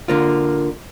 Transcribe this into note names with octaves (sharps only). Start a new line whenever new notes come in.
D3 A#3 F4